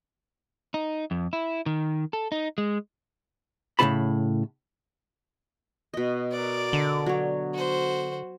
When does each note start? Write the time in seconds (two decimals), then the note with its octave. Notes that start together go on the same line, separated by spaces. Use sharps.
0.74 D#4
1.11 F2
1.33 E4
1.66 D#3
2.13 A4
2.32 D#4
2.58 G#3
3.79 A2 C#3 D4 F4 A5 B5
5.94 B2 D#5
6.32 A#4 D5
6.73 D3
7.06 F#3 C#5
7.54 F#4 C5